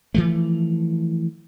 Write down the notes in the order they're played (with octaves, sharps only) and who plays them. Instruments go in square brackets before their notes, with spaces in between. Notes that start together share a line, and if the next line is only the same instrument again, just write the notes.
[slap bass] E3 F3 A3